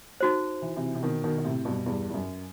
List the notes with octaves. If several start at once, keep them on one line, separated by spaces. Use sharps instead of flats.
D#4 F#4 C5
E3
C3 E3
C3
B2 D#3
B2 D#3
D#3
A2 C3
G2 B2
E2 G2
G2
F#2